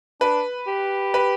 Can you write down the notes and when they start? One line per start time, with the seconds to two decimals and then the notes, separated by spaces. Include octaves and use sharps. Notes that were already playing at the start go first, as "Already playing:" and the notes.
0.21 D4 B4
0.67 G4
1.14 B4